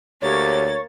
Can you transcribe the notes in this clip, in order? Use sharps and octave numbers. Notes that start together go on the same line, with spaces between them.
D2 A#3 G4 C#5 A6